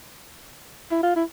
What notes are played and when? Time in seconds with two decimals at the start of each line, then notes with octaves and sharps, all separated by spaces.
0.91 E4
1.03 F4
1.16 E4